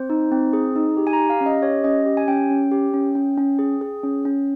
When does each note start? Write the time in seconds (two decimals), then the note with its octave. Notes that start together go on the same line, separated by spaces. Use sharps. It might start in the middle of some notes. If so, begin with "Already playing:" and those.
Already playing: C4 C5
0.10 D#4
0.31 C4
0.53 G#4
0.76 D#4
0.97 G4
1.07 G#5
1.13 A#5
1.19 G4
1.30 F5
1.41 C#4
1.46 D#5
1.62 G4 C#5
1.84 C#4 D#5
2.06 G4
2.17 G#5
2.28 C#4 G5
2.50 C#4
2.71 G4
2.94 C#4
3.15 C#4
3.38 C#4
3.59 G#4
3.81 G#4
4.03 C#4
4.25 C#4